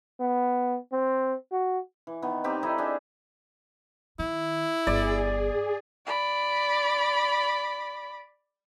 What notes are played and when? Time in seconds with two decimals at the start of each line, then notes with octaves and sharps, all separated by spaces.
0.20 B3
0.92 C4
1.52 F#4
2.07 E3
2.22 D#3 B3
2.44 C4 D#4 G4
2.63 D#4 E4 A4 D#5
2.78 D4 G#4 E5
4.19 D#3 E4
4.87 G1 G#4 D5
6.06 D5 B5